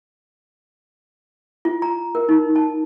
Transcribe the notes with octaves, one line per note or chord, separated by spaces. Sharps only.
F4
A#5
A#4
D#4
A5